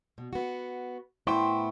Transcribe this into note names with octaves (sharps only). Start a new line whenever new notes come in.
B2
B3 F#4
A2 B3 E4 C5 G5